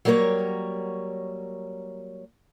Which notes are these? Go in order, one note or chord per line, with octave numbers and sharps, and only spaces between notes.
F#3 G3 A#3 A#4 C#5